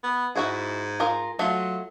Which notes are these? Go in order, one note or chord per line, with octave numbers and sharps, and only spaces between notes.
B3
G#2 E4 F#4 G#4
F4 G#4 A#4
F#3 A3 F4